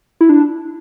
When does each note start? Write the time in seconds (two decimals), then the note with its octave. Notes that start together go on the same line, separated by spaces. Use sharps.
0.21 E4
0.29 D4